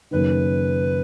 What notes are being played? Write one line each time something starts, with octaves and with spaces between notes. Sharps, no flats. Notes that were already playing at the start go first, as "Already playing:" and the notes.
F#1 F#2 D#3 B4